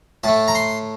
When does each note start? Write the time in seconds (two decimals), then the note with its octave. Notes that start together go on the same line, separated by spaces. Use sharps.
0.24 A2 A3 A5
0.48 A#5
0.55 C6